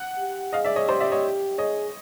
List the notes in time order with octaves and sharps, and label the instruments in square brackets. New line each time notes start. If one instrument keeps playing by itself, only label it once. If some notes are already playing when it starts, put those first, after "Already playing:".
Already playing: [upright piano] F#5
[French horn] G4
[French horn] G#4 [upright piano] D#5 F5
[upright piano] D5 E5
C#5 D#5
[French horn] G4 [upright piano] C5 D5
[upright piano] D5 E5
C#5 D#5
[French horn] G#4 [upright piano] C#5 D#5